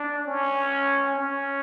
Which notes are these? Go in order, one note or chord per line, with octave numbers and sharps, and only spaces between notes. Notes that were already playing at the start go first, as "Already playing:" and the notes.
Already playing: D4
C#4
C#4